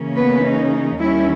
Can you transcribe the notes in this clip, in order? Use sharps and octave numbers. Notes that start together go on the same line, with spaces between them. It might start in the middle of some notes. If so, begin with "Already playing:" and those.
Already playing: C#3 E3 A#3 C#4
B3 B4
D#4
D#2 D#3 G3 C#4 E4